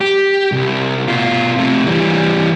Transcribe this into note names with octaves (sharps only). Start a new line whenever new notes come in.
G4
C2
B2 F4
C3 A3
E3 G3